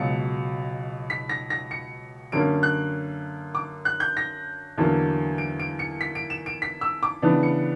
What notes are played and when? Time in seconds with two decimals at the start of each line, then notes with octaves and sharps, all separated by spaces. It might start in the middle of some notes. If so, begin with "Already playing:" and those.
Already playing: C#2 B2 F#3 C#7
1.10 B6
1.29 A#6
1.50 A#6
1.71 C#7
2.32 F#2 D3 A#3 C#4 D7
2.63 F#6
3.55 D6
3.85 F#6
4.00 G6
4.17 A#6
4.78 E2 D3 F#3 A#3
5.38 D7
5.60 D7
5.79 C#7
6.01 B6
6.15 D7
6.30 E7
6.46 D7
6.62 B6
6.81 E6
7.03 D6
7.22 C#3 E3 B3 D4
7.43 C#7